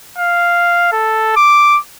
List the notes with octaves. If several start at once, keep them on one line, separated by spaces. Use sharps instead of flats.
F5
A4
D6